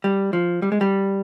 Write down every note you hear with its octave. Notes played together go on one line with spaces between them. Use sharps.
G3
F3
G3
G#3
G3